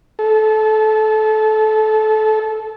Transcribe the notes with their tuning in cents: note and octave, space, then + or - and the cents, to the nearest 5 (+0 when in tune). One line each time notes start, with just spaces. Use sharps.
A4 -20